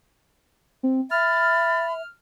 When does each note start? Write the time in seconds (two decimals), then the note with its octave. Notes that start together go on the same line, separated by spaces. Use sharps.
0.83 C4
1.11 E5 B5 F6 A6